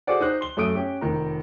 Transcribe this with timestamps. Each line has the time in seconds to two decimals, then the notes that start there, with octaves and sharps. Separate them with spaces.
0.07 F#4 G#4 A4 C5 D5 F#5
0.21 D#4 C5 F#6
0.41 C6 G7
0.57 F#2 A3 D#6 D7
0.75 C#4 G4
1.01 F1 D#3 A#5